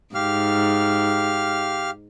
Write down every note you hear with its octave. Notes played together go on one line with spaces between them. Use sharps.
G#2 G4 F5 F6